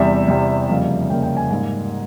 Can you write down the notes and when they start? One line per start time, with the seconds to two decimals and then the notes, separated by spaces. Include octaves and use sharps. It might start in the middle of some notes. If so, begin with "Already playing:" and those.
Already playing: E2 C3 G3 E5
0.28 E2 C3 G3
0.69 F2 C#3 G3 A#3 F5
1.09 F2 C#3 G3 A#3 G5
1.23 G5
1.37 G#5
1.51 G#2 G3 A#3 G#5